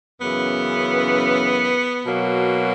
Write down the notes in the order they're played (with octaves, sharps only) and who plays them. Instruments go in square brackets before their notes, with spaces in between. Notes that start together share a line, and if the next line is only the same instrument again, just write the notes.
[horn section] F#2 C#3 E3 B3
B2 F#3 A#3